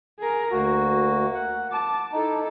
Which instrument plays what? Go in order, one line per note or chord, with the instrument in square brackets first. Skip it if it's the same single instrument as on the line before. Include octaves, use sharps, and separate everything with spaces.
[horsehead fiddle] G#4 A#4
[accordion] D2 F#4 [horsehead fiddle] A#3
[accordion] F#5
[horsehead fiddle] A5 [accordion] D6
[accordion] D#4 [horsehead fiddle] E4 A4